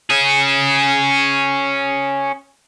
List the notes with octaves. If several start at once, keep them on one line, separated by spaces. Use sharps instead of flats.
C#4 G#4